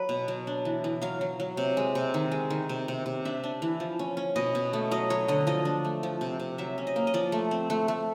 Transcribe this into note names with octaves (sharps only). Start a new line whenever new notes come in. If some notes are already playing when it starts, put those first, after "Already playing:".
Already playing: F#3 B4
B2
F#3
D4
E3
E3
F#3 F5
F#3
F#3
C3
G#3
C3
D#3
G#3
D#3
C3
C3
C3
D4 E5
D4
E3
F3
C#4
C#4
B2 D#5
B2
A3
F#3 D#5
F#3 C#5
D3 D#5
F3 D#5
D4
A3
F3
C3
C3
F#3 E5
C#4
D#5
A#3
D#5
F3 D5
A3
C4
A3
A3